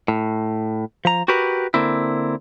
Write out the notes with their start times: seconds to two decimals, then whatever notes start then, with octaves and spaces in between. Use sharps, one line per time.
0.08 A2
1.05 F3 A#5
1.28 F#4 G4 A#4 B4
1.74 D3 A#3 C4 E4